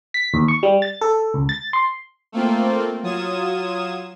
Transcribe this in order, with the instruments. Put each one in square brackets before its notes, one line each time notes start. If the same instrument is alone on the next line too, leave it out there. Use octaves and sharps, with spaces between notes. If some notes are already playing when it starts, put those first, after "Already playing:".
[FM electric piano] B6
D#2
C#6
G3
A6
A4
C#2
A6
C6
[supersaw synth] A3 A#3 C4 F4
F#3 F4 D#6 G#6 E7